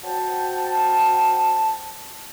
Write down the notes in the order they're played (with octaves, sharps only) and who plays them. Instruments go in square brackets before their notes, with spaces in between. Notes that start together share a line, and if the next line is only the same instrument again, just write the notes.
[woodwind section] F#4 C5 G5 A5